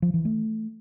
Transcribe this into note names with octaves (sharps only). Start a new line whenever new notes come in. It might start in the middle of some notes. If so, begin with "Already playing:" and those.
F3
E3
A3